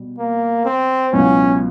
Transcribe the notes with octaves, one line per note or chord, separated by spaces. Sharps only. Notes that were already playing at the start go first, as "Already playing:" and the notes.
Already playing: B2 G3
A#3
C4
C#2 B2 F#3 B3 C#4 E4